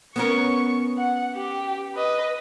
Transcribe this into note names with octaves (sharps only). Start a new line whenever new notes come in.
B3 C#4 A#4 C#6
F#5
G4
B4 D#5